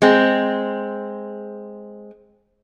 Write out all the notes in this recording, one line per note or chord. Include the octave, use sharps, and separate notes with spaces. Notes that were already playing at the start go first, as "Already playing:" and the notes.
G#3 C4